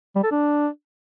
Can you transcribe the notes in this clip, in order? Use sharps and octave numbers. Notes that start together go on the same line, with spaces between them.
G3
A4
D4